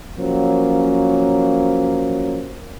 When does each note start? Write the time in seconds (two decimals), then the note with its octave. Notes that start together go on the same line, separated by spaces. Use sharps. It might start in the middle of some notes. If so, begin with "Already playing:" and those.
0.18 F3 F#3 A#3 C#4